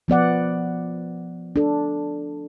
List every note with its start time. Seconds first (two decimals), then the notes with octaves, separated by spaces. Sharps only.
0.08 F3 B3 D5 F#5
1.56 D4 A4